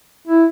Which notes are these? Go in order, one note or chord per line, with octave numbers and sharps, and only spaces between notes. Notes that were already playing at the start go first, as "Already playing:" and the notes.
E4